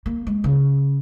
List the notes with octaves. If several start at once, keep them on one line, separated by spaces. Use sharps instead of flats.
A#3
G#3
C#3